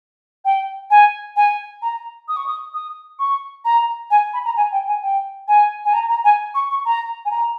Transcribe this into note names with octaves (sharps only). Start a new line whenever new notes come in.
G5
G#5
G#5
A#5
D#6
C#6
D#6
D#6
C#6
A#5
G#5
B5
A#5
G#5
G5
G#5
G5
G#5
G#5
A#5
A#5
G#5
C#6
C#6
A#5
G#5
A#5